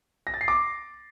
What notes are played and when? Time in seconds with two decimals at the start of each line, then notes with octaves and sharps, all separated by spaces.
0.27 A#6
0.34 A6
0.41 C7
0.48 D6